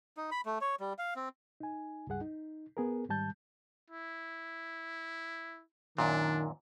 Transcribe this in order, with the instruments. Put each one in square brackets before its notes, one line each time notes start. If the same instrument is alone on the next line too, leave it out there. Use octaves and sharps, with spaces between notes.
[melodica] D#4
B5
A3
C#5
G3
F5
C4
[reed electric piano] D#4 G#5
C#2 G2 G3 G#4 F#5
D#4
B3 G#4 A#4
G#2 D#3 G3 A5 G6
[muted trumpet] E4
[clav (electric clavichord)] F#2 A#2 [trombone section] D#3 [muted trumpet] D4